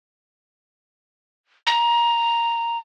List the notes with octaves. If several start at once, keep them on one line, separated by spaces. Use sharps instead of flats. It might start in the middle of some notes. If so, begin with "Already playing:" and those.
A#5